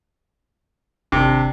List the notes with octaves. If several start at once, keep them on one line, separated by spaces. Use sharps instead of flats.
G#1 C3 D4